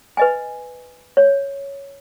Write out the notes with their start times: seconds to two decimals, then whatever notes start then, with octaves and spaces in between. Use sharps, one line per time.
0.17 B4 D#5 G#5
1.17 C#5